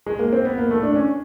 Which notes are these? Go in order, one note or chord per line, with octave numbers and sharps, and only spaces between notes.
G#3
A#3
C4
B3
A#3
A3
D4
C#4